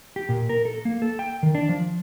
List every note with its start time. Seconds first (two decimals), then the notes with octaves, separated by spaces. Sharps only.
0.16 G4
0.29 A#2
0.49 A#4
0.65 A4
0.85 A#3
1.02 A4
1.19 G5
1.43 D#3
1.55 D4
1.69 F3